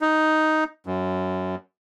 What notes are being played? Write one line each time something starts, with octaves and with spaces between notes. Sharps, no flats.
D#4
F#2